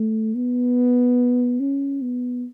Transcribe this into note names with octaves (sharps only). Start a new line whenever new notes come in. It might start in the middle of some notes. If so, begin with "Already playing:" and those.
Already playing: A3
B3
C#4
B3